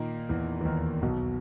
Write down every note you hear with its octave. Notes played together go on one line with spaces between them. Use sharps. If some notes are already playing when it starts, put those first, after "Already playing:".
Already playing: A#2 D#3 A#3 D#4
E2 E3
E3
D#2 D#3
B1 B2